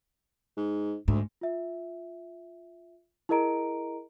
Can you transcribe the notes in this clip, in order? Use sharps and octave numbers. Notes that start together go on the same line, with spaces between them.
G#2
D2 G#2
F4 E5
E4 G#4 A#4 D#5 A#5 D7